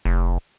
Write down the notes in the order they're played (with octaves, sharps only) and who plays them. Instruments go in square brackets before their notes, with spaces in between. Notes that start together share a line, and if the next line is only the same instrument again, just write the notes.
[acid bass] F1